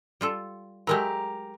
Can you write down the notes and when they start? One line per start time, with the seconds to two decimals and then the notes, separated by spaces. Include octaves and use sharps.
0.21 G3 F4 A4
0.87 F#3 G#3 A3 G4 A#4 A#5